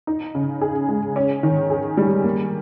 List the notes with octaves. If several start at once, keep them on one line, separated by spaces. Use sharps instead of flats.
D#4
C#3
G#4
G#3
C#4
D#3
G#4
G3
A#3